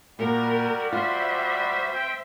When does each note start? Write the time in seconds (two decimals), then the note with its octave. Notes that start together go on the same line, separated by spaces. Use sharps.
0.19 A#2 G3 F#4 A#4
0.92 F4 C5 E5
1.92 C4 G5